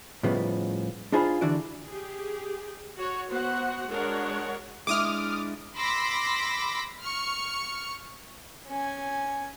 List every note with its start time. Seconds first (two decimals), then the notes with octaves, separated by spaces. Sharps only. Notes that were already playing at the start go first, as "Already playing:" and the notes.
0.23 A2 C#3 F3 G3 B3 D#4
1.12 D4 D#4 F4 G#4 C5 B5
1.41 D3 E3 D4 F#4 D5
1.86 G4 G#4
2.96 F#4 C#5
3.29 B3 F#4 C5 F#5
3.88 G#3 D4 F#4 A#4 C#5 F#5
4.87 G#3 D4 E4 D6 D#6 F6
5.75 B5 C6 D6 E6 A#6 B6
7.02 C#6 F6
8.68 C#4 G#5